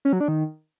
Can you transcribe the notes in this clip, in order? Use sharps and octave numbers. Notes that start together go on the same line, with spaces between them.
C#4
F#3
D4
D#3